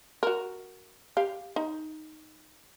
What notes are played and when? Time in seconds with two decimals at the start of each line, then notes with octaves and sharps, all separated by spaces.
0.23 F#4 A#4
1.17 G4 F5
1.56 D#4